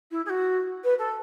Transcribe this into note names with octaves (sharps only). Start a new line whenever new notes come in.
E4
G#4
F#4
B4
A4